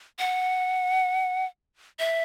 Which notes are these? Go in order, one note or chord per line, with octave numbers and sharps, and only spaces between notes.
F#5
E5